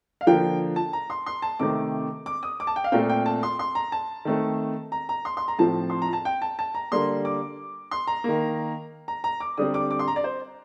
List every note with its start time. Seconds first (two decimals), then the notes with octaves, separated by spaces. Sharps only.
0.21 F5
0.26 D3 F3 A#3 G5
0.76 A5
0.93 A#5
1.10 C6
1.26 C6
1.42 A5
1.59 C3 D#3 A3 C4 D6
2.26 D6
2.43 D#6
2.60 D6
2.67 A5
2.76 G5
2.84 F5
2.92 A#2 A3 C4 G5
3.10 G5
3.26 A5
3.43 C6
3.59 C6
3.75 A#5
3.92 A5
4.25 D#3 A3 C4
4.92 A#5
5.09 A#5
5.25 C6
5.37 C6
5.48 A#5
5.59 A2 F3 C4 A5
5.90 C6
6.02 A#5
6.13 A5
6.25 G5
6.42 A5
6.59 A5
6.75 A#5
6.91 D3 G3 A#3 C6
7.25 D6
7.91 C6
8.07 A#5
8.24 D#3 A#3
9.08 A#5
9.24 A#5
9.40 D6
9.58 D3 G3 C4 D#6
9.74 D6
9.91 D6
9.99 C6
10.08 A#5
10.16 D5
10.24 C5